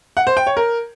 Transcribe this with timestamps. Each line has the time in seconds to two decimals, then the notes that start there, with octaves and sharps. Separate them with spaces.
0.17 F#5
0.27 C5
0.37 G5
0.47 C#5
0.57 A#4